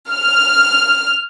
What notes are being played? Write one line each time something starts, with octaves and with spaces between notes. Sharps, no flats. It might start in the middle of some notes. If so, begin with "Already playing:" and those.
F6